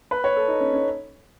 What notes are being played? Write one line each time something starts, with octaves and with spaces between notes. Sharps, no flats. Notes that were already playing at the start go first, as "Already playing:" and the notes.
B4
C#5
A4
D#4
C#4
C#4